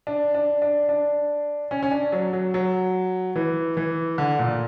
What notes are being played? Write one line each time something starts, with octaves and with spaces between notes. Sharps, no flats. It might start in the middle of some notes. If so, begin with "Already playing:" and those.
D4
D4
D4
D4
C#4
C#4
D4
F#3
F#3
F#3
E3
E3
D3
A#2